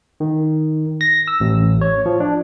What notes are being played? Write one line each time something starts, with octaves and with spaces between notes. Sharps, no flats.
D#3
A#6
E6
A1
C#5
F3
D4